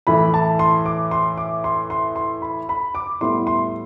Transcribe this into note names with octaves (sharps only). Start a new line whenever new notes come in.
A2 E3 A3 B5
A5
C6
D6
C6
D6
C6
C6
C6
B5
B5
D6
A2 G3 B3 E4 C6
C6